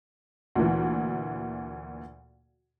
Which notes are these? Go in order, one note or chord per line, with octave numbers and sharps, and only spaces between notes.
D2 A#2 E3